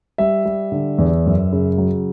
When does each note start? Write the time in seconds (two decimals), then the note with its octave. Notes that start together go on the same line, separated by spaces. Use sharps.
0.18 G3 E5
0.45 G3
0.72 D3
0.98 E2
1.26 F#2
1.53 C#3
1.78 F#3